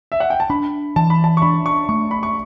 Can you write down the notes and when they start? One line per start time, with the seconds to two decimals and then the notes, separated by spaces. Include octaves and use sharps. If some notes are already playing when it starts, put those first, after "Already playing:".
0.12 E5
0.20 F#5
0.30 G5
0.40 A5
0.50 D4 B5
0.96 E3 A5
1.10 B5
1.24 A5
1.37 C#6
1.42 D4 B5
1.66 C#6
1.89 A3 C#6
2.11 B5
2.23 C#6